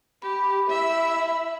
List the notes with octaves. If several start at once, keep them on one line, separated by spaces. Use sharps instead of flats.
G4 B5
E4 E5